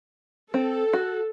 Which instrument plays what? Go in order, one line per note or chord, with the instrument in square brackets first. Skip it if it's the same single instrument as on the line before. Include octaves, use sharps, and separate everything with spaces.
[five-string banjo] C4 [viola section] A4
[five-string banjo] F#4